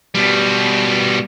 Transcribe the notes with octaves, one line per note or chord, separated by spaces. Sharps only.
B2 G3